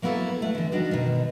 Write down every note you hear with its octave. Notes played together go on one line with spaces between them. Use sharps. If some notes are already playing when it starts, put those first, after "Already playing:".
F#3 A#3 B3 E4 A4 C#5
G3 A3 F#5
D3 E3
G3 D4 D#4 F#4
B2 D#3